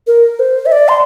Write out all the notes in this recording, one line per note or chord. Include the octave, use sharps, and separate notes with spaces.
A#4
C5
E5
D5
C6